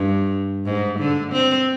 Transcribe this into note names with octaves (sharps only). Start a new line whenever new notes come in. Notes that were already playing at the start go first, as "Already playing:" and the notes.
Already playing: G2
G#2
D3
C4